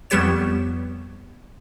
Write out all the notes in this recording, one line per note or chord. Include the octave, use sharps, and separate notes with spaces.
F2 G3 B3 G4 C#5 E7